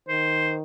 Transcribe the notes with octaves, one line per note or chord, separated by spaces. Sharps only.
D#3 C5